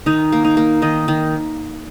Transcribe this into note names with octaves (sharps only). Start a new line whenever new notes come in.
D#3 D#4
A#3
D#4
A#3
D#3 D#5
D#3